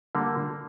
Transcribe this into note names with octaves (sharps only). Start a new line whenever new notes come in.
D3 G3 A#3